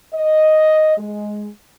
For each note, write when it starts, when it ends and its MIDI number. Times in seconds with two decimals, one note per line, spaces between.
0.13 0.97 75
0.98 1.47 56